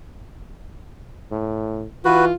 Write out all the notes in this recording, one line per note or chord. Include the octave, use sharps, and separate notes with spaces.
A2
E3 F4 F#4 B4